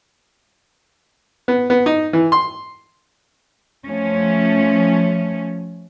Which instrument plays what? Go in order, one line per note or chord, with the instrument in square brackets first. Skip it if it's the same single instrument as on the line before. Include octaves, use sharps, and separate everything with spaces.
[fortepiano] B3
B3
D#4
E3
C6
[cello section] F3 A3 C#4